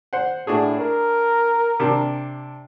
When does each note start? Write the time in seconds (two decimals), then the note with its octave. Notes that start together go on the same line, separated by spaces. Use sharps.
0.13 C5 F#5
0.47 A2 D4 F#4 G#4
0.79 A#4
1.80 C3 D4